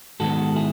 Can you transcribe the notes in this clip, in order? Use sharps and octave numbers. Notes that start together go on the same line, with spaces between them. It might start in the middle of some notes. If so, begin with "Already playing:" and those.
G#2 D#3 G#3 B3 F#4 A4
E4 G#4